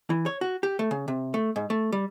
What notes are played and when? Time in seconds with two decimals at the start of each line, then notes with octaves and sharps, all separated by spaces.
0.10 E3
0.26 C#5
0.41 F#4
0.63 G4
0.79 A3
0.91 C#3
1.08 C3
1.34 A3
1.56 G#2
1.70 A3
1.92 G3